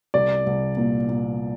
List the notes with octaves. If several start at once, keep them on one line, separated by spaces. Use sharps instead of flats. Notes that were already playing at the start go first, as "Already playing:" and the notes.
C2 D5
C2
A#2
A#2